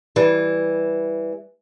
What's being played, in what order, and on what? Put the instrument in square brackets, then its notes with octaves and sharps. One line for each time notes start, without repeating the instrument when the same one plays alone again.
[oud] E3 G3